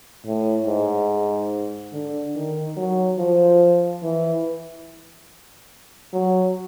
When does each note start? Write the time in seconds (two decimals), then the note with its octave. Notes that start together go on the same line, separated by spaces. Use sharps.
0.26 A2
0.67 G#2
1.93 D3
2.36 D#3
2.77 F#3
3.19 F3
4.03 E3
6.13 F#3